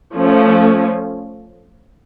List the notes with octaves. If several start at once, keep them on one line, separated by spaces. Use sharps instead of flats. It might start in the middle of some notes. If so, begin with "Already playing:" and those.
F3 A3 C#4